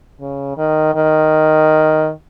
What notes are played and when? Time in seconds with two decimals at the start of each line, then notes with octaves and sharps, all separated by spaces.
0.21 C#3
0.58 D#3
0.95 D#3